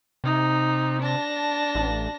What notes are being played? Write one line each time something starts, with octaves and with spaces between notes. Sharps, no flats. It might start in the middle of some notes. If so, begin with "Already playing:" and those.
C3 D#4
D4 A5 A#6
A1